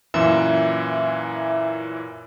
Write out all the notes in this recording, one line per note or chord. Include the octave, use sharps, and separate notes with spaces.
F#2 A#2 E3 E5